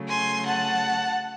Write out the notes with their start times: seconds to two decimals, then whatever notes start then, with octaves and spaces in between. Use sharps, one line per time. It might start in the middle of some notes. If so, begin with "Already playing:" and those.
Already playing: C#3 F#3 A3
0.09 G#5 C6
0.46 F#5 A5